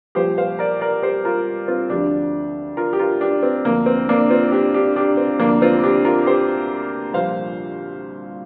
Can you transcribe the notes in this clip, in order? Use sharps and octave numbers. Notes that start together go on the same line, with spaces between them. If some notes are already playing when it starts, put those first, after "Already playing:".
C2 A#2 F3 G4 C5
C5 F5
A#4 D5
A#4 D5
G4 C5
F4 A#4
C4 F4
D2 D3 F3 D4 G4
F4 A#4
G4
F4 A#4
D4 G4
C4
D2 D3 F3 A#3
C4
A#3 D4
C4 F4
D4 G4
D4 G4
D4 G4
C4
D2 C3 F3 A#3 D4
C4 F4
D4 G4
F4 A#4
G4 C5
C2 A#2 F3 C5 F5